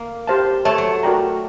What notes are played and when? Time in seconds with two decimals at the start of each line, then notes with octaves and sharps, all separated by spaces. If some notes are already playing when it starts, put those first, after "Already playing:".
Already playing: A#3
0.27 G4 C5 F5 A5
0.65 A3 A4 C#5 E5 A5
0.78 F#3
1.03 F#4 A#4 D5 G5 A#5